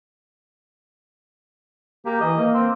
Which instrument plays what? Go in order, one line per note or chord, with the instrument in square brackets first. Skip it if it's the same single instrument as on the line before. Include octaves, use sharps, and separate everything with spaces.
[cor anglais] A#3 [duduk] G4
[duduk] E3 [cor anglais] D#5
[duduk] A#3
[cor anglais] C4